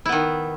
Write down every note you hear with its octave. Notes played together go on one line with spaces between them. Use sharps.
D#3 B3 E4